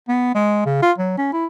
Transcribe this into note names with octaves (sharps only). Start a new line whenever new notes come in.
B3
G#3
C#3
F4
F#3
C#4
E4